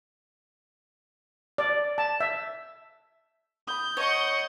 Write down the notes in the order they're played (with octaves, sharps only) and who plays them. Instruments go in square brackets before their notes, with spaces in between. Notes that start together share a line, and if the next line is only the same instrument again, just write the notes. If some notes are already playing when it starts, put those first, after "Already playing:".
[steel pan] D5
A5
E5
[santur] B5 D#6 [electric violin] G6
[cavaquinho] C#5 [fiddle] D#5 F#5 [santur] A5 C#6